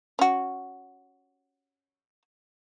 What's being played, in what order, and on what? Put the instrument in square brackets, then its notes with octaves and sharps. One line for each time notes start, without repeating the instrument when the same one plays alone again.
[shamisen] C#4 F#4